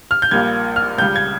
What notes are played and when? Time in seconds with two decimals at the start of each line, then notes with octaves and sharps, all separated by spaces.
0.11 F6
0.22 G6
0.31 A#1 A#2 G3 A#3 G#6
0.76 F6
0.98 C#2 C#3 G3 G6
1.16 G#6